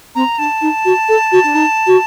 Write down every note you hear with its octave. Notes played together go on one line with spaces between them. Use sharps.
C4 A#5
D4 A5
D#4
F#4
A4
F#4
D4
D#4
F#4